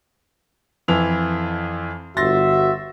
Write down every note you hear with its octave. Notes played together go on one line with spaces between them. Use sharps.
F2 E3 F7
G1 F#4 E5 C6 A6 A#6